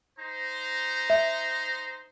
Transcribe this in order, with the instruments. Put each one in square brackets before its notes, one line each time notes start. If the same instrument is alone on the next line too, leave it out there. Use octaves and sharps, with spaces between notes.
[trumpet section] D#4 C5 A#5
[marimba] E5